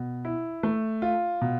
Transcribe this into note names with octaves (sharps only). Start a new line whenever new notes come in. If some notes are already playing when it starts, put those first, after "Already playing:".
Already playing: B2
E4
A3
F4
B2